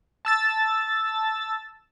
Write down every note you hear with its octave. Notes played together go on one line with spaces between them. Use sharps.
A5 E6 A6